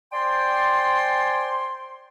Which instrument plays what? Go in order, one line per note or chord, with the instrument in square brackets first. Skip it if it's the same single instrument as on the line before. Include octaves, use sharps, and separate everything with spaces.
[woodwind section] C5 D5 G5 G#5 C6